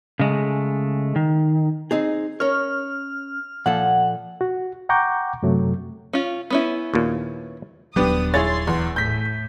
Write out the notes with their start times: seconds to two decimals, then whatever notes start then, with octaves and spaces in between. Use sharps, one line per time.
0.20 C#3 G#3 A3
1.16 D#3
1.91 C4 D#4 G#4
2.40 C#4 A#4 C#5 F6
3.66 A#2 F3 A4 F#5
4.41 F#4
4.89 F#5 G5 A#5 C#6 D6 G6
5.43 F#2 C3 F#3 A3
6.13 C#4 F4
6.50 B3 C#4 E4
6.94 D#2 A#2
7.96 D#1 F#3 B3 D4 G4 D#6
8.34 E4 G#4 C#5 C6 A6
8.67 E2
8.96 A2 G6 B6